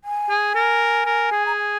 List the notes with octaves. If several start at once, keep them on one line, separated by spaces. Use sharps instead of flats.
G#5
G#4
A#4
A#4
G#4
A#5
G#5